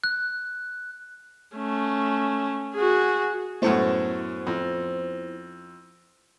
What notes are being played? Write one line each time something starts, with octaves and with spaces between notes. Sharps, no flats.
F#6
A3 C#4
F#4 G#4
F#2 A2 A3 B3 E4 C5
F2